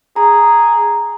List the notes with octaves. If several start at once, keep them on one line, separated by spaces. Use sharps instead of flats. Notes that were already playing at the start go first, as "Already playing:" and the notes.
G#4 A#5